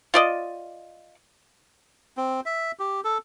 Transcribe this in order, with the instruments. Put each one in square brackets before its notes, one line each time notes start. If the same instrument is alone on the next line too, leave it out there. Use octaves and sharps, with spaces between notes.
[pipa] F4 D5 D#5
[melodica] C4
E5
G4
A4